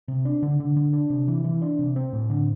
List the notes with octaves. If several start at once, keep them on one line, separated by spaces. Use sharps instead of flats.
C3
D4
D3
D3
D3
D4
C3
E3
E3
D4
C3
C4
A2
D3